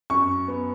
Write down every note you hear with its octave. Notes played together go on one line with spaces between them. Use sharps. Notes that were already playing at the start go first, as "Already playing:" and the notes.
F#2 C#6
B3